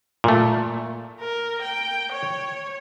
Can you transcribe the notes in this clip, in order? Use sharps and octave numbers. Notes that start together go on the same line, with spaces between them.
A#2 A3
A#4
G5
C#5